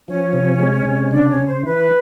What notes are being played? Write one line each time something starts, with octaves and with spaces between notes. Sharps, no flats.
F3 C#4 C#5
C3
G#3
C3
C#3 D4 D5
C#4 C#5
C#3
C5
E3 B4